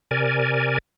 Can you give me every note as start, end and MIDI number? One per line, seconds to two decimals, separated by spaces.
0.11 0.78 48
0.11 0.78 70
0.11 0.78 74
0.11 0.78 80